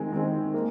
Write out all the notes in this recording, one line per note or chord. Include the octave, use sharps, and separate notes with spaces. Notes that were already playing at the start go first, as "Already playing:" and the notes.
Already playing: D#3 G#3 C4 G#5
D#3 G#3 C4
A#3